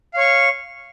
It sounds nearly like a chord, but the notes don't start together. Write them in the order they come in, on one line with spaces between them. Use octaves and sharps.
F5 C#5 C#6